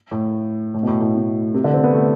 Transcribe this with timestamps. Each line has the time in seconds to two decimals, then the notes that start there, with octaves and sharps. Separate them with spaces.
0.11 A2
0.74 A2
0.83 B2
0.87 A2
1.01 A2
1.15 B2
1.54 C3
1.64 D3
1.74 C4
1.84 B3
1.94 A3